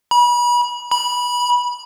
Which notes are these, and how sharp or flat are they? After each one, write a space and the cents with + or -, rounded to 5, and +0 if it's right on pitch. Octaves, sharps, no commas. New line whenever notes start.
B5 -35
B5 -20